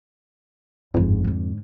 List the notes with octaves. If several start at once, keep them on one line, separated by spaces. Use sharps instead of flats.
G1 F2 G#2
G#2 D3